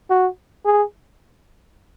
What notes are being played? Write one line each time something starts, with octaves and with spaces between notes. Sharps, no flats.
F#4
G#4